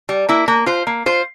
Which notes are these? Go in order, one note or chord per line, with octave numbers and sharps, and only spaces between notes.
G3
A#3 E4
A#3
F4 C5
A#3
F4 C5